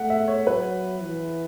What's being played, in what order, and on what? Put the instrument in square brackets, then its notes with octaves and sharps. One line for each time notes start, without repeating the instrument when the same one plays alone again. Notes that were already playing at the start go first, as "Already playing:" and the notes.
Already playing: [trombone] A3 [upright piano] E5 F#5
[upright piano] E5
C#5
[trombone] F#3 [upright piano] B4
[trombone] E3